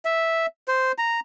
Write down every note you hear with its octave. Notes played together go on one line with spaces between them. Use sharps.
E5
C5
A#5